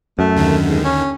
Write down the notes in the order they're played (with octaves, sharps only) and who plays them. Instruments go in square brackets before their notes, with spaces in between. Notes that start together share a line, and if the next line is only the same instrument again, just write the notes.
[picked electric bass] F#2 [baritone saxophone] A3
[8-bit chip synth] D#2 D3 D#3
[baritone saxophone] G#2
C#4